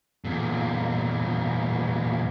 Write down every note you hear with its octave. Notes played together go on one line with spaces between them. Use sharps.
E2 A#2